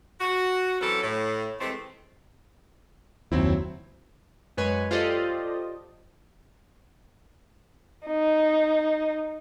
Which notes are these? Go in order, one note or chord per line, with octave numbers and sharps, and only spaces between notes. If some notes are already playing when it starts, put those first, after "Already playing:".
F#4
E3 F#3 C4 C#4 A4 B4
A2
C3 E3 G#3 A3 C4
F#1 D#2 F#3 C4 E4
F#2 G#3 B4 C#5 G#5
F4 G4 A4 C5 D5 D#5
D#4